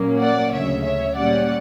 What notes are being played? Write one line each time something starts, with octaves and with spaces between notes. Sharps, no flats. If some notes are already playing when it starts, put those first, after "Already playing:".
Already playing: A#2 F#3 A#3 C#4
D5 F#5
D2 C#3 F#3 C#5 E5
C#5 E5
A#2 G3 C#4 D5 F#5